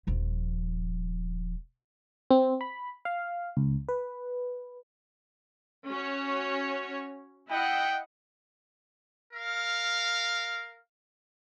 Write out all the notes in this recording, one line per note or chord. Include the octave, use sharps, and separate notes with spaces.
D#1 F3
C4
B5
F5
C#2
B4
C#4 F#4 C#5
E4 D#5 F#5 G5
A#4 F5